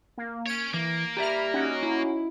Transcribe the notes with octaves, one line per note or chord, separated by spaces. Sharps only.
A#3
C#4 C#5 D7
E3 A#3
G4 D5 E5 A#5 B5 F6
C#4 D#4 F#4
E4